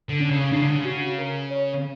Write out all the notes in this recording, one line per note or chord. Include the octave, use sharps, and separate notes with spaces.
D3
C#4
C#3
C#3 D4
D3
C#3
F#4
A#4
C#5